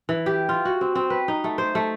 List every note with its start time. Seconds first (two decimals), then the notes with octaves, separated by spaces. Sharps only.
0.09 E3
0.26 G4
0.49 F4
0.65 F#4
0.81 C4
0.95 C4
1.10 B4
1.28 D#4
1.44 A3
1.58 C5
1.75 A3